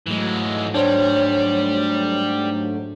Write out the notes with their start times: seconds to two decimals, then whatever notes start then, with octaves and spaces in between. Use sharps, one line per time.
0.06 G#2 E3 F#3 G#3 A3
0.74 G3 D4 C5 C#5